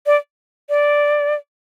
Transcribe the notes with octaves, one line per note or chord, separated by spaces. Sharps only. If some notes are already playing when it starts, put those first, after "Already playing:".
D5
D5